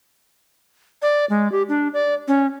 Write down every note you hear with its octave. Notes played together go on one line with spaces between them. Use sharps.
D5
G#3
G4
D4
D5
C#4